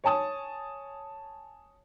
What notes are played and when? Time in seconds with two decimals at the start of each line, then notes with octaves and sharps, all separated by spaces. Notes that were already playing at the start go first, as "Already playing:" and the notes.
0.04 C#5 G#5 A5 D#6